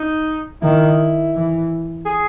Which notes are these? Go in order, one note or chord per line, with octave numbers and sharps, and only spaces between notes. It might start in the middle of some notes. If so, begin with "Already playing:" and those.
Already playing: D#4
D#3 E4
E3
G#4